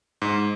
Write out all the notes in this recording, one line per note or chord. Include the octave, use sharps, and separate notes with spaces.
G#2